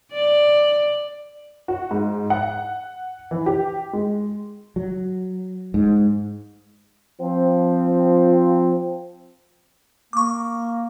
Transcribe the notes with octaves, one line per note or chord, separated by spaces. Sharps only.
D5
F#4
G#2
F#5
E3
G4
G#3
F#3
G#2
F3 C4
A#3 C#6 D6